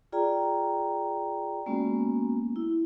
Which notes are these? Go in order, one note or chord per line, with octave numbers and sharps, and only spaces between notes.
F4 G#4 D5 G5 A#5
G#3 A#3 B3 C#4 F#4
E4